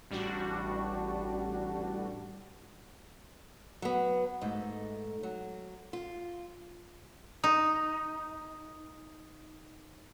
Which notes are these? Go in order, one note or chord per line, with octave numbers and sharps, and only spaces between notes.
A1 G3 D4 F#4
F#3 B3
G#2 A3 D#4
F#3
F4
D#4 D#6